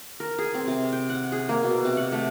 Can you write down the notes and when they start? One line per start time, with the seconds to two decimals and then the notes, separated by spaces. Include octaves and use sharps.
0.20 A#4
0.39 G#4
0.54 C4
0.67 C3
0.92 G5
1.09 F#5
1.32 G#4
1.49 A#3
1.64 B2
1.84 C3
1.97 F#5
2.12 A3